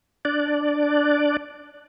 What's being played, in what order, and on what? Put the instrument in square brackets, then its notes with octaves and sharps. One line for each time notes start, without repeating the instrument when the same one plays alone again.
[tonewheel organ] D4 D5